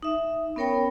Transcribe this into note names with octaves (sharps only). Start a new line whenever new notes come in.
D#4 E5
B3 C#4 A#4 C#5 G5 B5